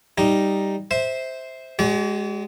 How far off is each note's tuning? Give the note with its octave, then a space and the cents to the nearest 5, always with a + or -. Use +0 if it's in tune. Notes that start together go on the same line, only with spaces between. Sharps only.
G3 +0 D#4 +0
C5 +0 E5 -20
G#3 +0 F#4 +45 D5 -45